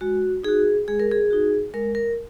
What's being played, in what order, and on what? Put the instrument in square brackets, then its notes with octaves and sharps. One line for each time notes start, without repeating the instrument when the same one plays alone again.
[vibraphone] G#3 F#4
D#4 F#4 G#4
G#3 G#4
A#4
G#4
D#4 F#4
G#3 A#4
A#4